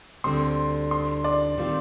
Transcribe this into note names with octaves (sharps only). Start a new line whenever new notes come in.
D2 D3 G3 C4 C6
C6
D5
D#3 G3 C4 F4